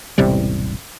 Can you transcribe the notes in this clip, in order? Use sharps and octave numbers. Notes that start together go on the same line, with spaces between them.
E1 A1 C3 G3